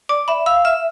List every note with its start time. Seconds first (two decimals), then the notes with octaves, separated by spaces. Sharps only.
0.09 D5 D6
0.28 E5 B5
0.46 F5 E6
0.65 E5 F6